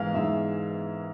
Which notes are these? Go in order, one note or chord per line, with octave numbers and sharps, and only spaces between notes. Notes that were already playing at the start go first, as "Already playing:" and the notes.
Already playing: G#2 E3 G#3 F5
G#2 E3 G#3 E5